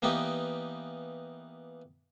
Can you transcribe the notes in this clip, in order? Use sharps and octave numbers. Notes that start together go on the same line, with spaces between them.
E3 A#3 B3 D#4 G4 D5